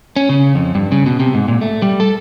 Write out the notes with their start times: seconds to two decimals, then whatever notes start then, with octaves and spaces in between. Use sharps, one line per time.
0.16 C#4
0.29 C#3
0.55 F2
0.75 G2
0.92 C#3
1.06 B2
1.20 C3
1.34 G#2
1.48 A#2
1.61 A3
1.82 G3
2.00 A4